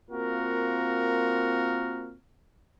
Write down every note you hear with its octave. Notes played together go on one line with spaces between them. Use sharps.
A#3 C4 F4 F#4 A#4